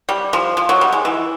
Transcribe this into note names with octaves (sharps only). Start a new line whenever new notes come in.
G3
F3
F3
F#3
G3
G#3
E3